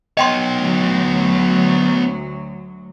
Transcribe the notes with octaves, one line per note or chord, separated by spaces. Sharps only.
B3 C#5 D#5 G5 C6
D2 F#3